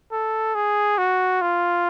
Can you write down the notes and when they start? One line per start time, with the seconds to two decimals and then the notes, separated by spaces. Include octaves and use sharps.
0.12 A4
0.55 G#4
0.98 F#4
1.42 F4